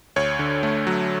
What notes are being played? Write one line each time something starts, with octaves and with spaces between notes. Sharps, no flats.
D2 C#5
D3
A3
F#3